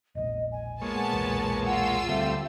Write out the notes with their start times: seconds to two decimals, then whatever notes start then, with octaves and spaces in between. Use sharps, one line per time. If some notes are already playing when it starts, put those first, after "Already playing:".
0.15 E1 A#1 D#5
0.51 G#5
0.82 A#2 G#3 B3 C#5 A5
1.13 B1 E2
1.64 F4 F#5 E6
2.08 D2 G3 A3 C4 E5